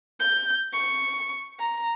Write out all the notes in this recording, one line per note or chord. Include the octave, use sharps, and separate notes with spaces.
G6
C#6
A#5